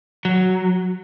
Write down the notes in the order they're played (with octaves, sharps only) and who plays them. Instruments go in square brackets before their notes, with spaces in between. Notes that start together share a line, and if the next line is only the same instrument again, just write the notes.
[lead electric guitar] F#3